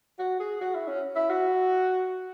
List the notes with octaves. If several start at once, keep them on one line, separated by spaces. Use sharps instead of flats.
F#4
G#4
F#4
E4
C#4
E4
F#4